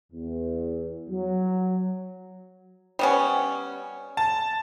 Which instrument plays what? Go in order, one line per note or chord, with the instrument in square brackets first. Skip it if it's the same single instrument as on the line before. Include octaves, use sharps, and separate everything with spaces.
[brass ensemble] E2
F#3
[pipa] G3 B3 C#4
[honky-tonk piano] A5